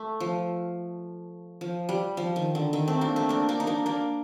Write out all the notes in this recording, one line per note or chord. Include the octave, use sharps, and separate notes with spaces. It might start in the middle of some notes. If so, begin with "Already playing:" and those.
Already playing: A3
F3
F3
G3
F3
D#3
D3
D#3
A3 C4
A#3 D4
A3 C4
A#3 D4
A#3 D4
D#4
A#3 D4
A#3 D4